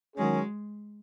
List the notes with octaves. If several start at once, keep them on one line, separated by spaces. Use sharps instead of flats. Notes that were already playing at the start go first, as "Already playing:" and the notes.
D#3 F#3 G#3 C#4 G#4